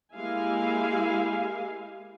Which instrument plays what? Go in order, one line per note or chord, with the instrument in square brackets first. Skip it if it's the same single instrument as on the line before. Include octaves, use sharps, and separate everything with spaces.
[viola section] G#3 A#3 E4 G4 F5 G#5